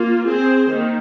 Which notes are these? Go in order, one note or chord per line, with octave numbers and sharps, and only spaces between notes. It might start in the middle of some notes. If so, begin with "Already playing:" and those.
Already playing: A#3 F4
C4 G#4 C5
D#3 A#3